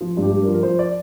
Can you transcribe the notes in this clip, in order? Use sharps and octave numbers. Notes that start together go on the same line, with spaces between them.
F3 F4
G2
G4
G2
A#4
F3
A#4
F3 C5
D5